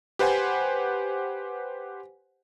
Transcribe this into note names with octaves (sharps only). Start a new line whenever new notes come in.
G4 B4 C5 F#5 G#5